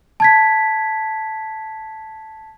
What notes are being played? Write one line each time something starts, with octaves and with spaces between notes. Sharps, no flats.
A5 G#6 B6